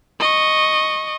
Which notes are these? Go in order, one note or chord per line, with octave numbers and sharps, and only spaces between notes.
D#5 C#6